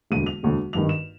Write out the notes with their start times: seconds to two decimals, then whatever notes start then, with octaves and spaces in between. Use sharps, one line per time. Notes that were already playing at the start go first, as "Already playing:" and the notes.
0.11 E1 D2 D3 D#7
0.26 F7
0.43 E1 D2 D3
0.73 G#1 G2 D#3 F7
0.89 E7